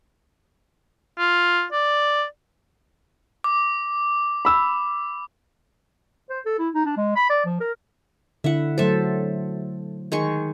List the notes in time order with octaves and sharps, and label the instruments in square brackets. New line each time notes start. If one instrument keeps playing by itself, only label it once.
[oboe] F4
D5
[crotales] D6
[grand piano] B5 E6
[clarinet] C5
A4
E4
D#4
D4
G#3
B5
D5
F3
A#4
[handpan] D3 E4 [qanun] E5 F#5
[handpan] F#3 A3 C5 [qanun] A4 E5
[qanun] D#3 G#3 C#6